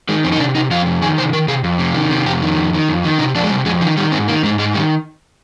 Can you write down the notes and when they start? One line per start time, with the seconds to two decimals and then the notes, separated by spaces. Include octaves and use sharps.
0.09 D#3 G#3
0.24 F2 C4
0.32 D#4
0.40 C3 D4
0.55 C3 D#4
0.71 F2 F4
0.86 C3
1.02 D#3 G#4
1.18 C3 C5
1.33 D#3 A#4
1.48 C3 G#4
1.64 F2
1.79 C3
1.94 D#3
2.11 C3
2.26 F2 G4
2.42 D#3
2.58 F2
2.73 D#3
2.89 F2
3.04 D#3
3.19 C3 D#4
3.35 F2 D4
3.44 G#3
3.50 C3 G3
3.66 F2 G#3
3.81 D#3 F3
3.97 D#3 G3
4.12 G#2 C4
4.28 D#3 A#3
4.43 G#2 G#3
4.59 G#2 G#3
4.74 D#3 G3